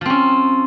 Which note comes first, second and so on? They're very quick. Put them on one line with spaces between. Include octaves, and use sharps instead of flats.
F3 C4 C#4